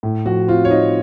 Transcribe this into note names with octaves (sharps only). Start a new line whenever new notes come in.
A2
F3 F#4
C4 F4
C#5
D#4 D#5